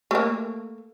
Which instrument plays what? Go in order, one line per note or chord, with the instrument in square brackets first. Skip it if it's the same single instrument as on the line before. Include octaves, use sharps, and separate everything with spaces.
[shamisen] A3 A#3